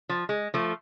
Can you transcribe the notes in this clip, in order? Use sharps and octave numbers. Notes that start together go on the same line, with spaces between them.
F3
G#3
F3 A3